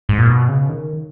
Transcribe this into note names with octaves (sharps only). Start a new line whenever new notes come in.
G#2
A#2
B2
C#3
D#3